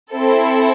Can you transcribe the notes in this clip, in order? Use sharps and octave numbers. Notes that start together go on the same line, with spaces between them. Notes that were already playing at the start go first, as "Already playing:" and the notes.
C4 E4 A4